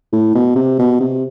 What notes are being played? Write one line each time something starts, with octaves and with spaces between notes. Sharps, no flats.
A2
B2
C3
B2
C3